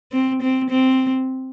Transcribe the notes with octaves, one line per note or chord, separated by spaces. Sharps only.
C4
C4
C4